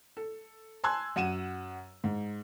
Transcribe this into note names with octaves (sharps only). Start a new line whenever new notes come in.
A4
G#5 A5 C6 E6 F#6 G#6
F#2 F#5 D#7 E7
G#2